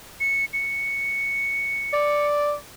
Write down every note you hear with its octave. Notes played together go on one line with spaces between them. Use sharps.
C#7
C#7
D5